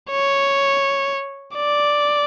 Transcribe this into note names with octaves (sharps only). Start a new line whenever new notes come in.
C#5
D5